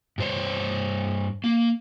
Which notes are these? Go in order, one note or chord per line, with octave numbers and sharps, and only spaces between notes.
G2 C5 C#5
A#3